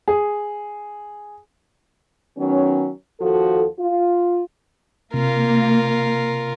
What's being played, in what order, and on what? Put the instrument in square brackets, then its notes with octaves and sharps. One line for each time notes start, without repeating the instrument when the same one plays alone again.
[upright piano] G#4
[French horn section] D#3 F#3 B3 C#4
D#2 F3 F#4 A4
F4
[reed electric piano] C3 [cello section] A#3 [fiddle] F4 A#4